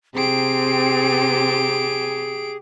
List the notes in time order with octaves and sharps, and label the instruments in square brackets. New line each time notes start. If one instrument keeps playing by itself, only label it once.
[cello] C3 C4 [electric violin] G4 D7 [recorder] G#4